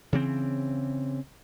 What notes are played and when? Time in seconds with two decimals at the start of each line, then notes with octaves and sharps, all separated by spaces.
0.13 C#3 E3 C4